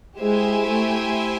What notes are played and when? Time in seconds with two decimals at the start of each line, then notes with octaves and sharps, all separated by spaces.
0.19 G#3 E4 G4 C5 E5 G#5
0.68 A3